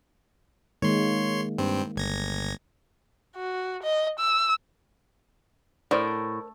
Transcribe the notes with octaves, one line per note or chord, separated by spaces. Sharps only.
D#3 G#3 A#3 C#5 C6
G2 C4
G1 G#6 A#6
F#4
D#5
E6
A2 A#4 C5 D5